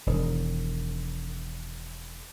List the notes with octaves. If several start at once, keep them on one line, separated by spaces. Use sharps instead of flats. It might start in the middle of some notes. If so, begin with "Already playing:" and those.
E1 D#3